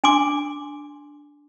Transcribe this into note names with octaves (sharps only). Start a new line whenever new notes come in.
D4 G#5 C6 D6